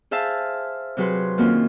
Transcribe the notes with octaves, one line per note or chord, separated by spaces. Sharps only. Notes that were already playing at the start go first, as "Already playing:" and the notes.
G#4 C5 E5 F5 A5
C3 F#3 G#4 B4 C6
F#2 D#3 A#3 C4 C#4 F4